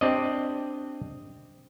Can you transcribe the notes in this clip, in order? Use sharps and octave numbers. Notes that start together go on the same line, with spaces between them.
C4 D4 G4 D5 D#5